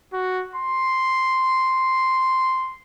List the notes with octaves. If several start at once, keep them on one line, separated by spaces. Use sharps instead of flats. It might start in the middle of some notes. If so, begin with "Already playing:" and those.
F#4
C6